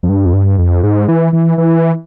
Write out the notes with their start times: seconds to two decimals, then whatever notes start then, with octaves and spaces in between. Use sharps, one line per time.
0.03 F2
0.09 G2
0.26 F2
0.33 G2
0.58 F2
0.83 G#2
1.08 E3
1.33 E3
1.58 E3